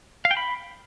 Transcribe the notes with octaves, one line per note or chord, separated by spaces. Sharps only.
F5
G5
B5